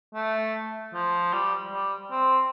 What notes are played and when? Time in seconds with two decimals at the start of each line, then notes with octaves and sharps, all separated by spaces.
0.15 A3
0.94 F3
1.33 G3
1.72 G3
2.11 C4